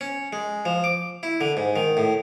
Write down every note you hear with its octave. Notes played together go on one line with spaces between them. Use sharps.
C#4
G#3
F3
D6
E4
D3
G#2
D#3
A2